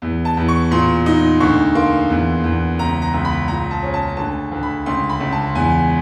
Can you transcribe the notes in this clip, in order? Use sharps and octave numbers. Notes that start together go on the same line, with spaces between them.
E2
A5
E2
C#6
A#2 C6
D#4
D2 C#6
A#3 C6
E2
E2
C#2 A#5
A#5
C#2
B5
A#2 A#5
A5
C#4
A5
D2 A5
D2
B5
C#2 C6
B5
C#2
A5
E2 G#5